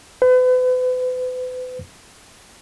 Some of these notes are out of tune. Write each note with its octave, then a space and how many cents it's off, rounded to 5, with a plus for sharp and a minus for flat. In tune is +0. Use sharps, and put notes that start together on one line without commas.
B4 +40